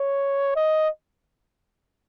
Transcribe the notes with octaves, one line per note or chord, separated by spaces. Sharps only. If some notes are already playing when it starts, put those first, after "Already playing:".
Already playing: C#5
D#5